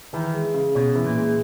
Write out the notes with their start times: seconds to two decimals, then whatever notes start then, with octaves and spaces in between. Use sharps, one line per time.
0.13 D#3 E3
0.33 G#3
0.54 C#3
0.75 B2 C#4
0.95 E3
1.06 A#2
1.16 G#3